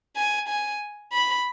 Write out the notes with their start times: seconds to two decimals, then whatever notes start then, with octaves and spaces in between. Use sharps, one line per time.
0.16 G#5
0.49 G#5
1.13 B5